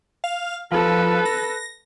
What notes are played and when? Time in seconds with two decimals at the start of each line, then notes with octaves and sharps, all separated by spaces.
0.24 F5
0.72 F3 A4 B4
1.25 A#6